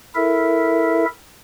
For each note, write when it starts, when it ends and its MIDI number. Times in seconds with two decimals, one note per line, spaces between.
0.15 1.05 64
0.15 1.05 69
0.15 1.05 70
0.15 1.05 76